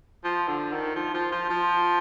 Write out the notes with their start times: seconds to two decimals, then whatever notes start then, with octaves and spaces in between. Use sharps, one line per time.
0.24 F3
0.48 D3
0.73 D#3
0.96 F3
1.14 F3
1.32 F3
1.50 F3